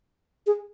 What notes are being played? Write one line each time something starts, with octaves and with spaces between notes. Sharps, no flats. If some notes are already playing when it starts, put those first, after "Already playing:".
G#4